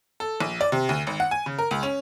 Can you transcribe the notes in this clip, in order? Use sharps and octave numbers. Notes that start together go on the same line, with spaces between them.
A4
A#1
D5
C3
D2
G#1
F#5
G#5
C#3
A#4
C#2
C#4